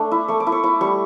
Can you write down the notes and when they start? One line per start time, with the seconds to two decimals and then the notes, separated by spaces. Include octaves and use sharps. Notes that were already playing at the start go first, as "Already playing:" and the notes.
Already playing: A3 D4
0.11 E4
0.28 A3 C#6
0.40 D6
0.47 E4
0.52 C#6
0.64 E4 D6
0.81 G3 C#6